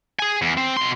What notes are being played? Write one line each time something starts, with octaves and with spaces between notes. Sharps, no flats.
G#4 G#5
E2
C4
B2 C6